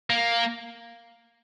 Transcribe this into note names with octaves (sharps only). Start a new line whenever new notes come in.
A#3